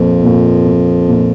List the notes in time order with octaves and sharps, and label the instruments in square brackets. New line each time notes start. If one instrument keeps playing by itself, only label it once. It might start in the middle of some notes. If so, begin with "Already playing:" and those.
Already playing: [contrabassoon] F2 [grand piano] A#2 F3
[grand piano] A#2
A#2
A#2